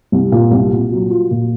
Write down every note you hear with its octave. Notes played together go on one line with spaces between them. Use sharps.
C2
A#2
C2
A#2
F#3
F4
A#2